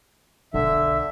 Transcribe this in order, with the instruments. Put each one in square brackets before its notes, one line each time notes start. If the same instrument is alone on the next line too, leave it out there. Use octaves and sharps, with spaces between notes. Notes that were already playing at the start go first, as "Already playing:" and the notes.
[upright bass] B1 [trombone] D3 [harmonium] E5